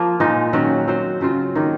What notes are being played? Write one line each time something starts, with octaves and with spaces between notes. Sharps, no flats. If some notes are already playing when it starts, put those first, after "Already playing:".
Already playing: F3 A#3 F4
A#2 G#3 D#4
D#3 F#3 C#4 F#4
F#3 C4 F#4 C5
C#3 F#3 C4 F4
D#3 A#3 D#4